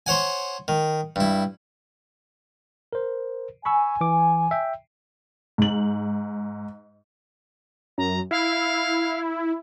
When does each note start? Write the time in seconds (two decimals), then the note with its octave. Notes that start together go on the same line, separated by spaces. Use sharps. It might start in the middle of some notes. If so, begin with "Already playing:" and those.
0.06 C5 C#5 F#5 G#5
0.68 D#3
1.16 G2 E4
2.93 A#4 C5
3.65 G#5 B5 C#6 E6
4.01 E3 D6
4.51 E5 G5
5.58 G#2 F#7
7.98 F#2 A#5
8.31 E4 F5